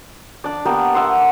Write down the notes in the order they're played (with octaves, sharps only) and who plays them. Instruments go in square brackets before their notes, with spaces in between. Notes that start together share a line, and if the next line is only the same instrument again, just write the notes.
[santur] D4 D5
A#3 B3 G4 A#4
E5 F#5 C6